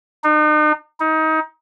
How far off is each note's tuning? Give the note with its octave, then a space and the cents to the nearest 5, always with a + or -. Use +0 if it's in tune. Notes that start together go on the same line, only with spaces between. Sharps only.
D#4 -40
D#4 +25